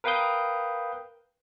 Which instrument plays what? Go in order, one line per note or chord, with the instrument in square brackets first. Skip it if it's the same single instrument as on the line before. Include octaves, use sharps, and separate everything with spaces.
[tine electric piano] A#4 B4 F5 G5 D#6 G6